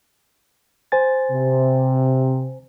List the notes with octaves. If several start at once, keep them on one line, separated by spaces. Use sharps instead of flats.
C5 G#5 A6
C3